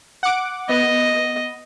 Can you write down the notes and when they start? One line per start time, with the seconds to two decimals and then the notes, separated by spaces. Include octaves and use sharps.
0.23 F#5 D6
0.69 B3 D#5